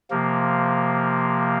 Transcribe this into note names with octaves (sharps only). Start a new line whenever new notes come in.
C3 F3 A#3